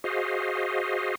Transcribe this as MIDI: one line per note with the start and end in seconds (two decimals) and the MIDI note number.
0.04 1.15 66
0.04 1.15 68
0.04 1.15 72
0.04 1.15 75
0.04 1.15 77